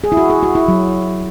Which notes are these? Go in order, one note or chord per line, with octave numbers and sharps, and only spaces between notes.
G#4
E4
F#4
G#4
F#4
E4
F#3